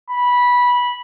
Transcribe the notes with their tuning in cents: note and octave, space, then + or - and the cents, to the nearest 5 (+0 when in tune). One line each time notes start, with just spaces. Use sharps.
B5 -15